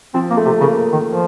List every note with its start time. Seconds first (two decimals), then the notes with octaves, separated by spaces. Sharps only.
0.14 F3 C4
0.30 A#3
0.37 A3
0.45 C3
0.60 C#3 A#3
0.92 D#3
1.08 F3